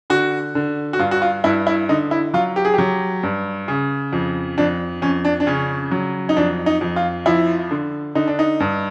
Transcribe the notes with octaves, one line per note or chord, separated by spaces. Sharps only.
D3 F#4
D3
F#4
G2 F4
F#4
F4
G2 E4
E4
D3 D#4
E4
F#3 F4
G4
G#4
F#3 G4
G2
C#3
F2
F2 D4
F2 C#4
D4
D4
C#3 C#4
F#3
D#4
F2 D4
D#4
F2
F4
F3 E4
D3
D3 D#4
D4
D#4
G2